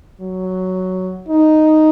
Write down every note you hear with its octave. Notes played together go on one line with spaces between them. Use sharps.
F#3
D#4